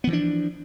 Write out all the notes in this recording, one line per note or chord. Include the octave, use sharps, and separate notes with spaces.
E3 F3 B3 D4